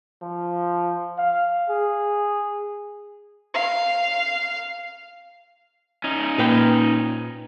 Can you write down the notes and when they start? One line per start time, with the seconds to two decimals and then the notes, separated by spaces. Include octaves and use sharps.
0.22 F3
1.18 F5
1.70 G#4
3.54 F5
6.04 C#4 D#4
6.38 A#2 B4 G5